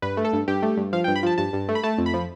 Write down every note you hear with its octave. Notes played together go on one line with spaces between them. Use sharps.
G2 B4
A3
A4
G2
G2 G4
A3
G2
F3 F5
G5
G2
B5
F3 A5
G2 A5
G2
A3
B5
A3 A5
F2
B5
F3